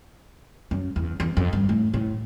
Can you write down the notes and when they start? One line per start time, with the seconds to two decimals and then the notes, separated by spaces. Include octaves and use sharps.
0.71 F#2
0.96 E2
1.20 E2
1.37 F2
1.53 G2
1.69 A2
1.94 A2